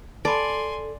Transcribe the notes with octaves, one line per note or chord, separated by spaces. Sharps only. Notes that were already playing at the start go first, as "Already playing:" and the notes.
A4 D5 G#5 A5 B5 C6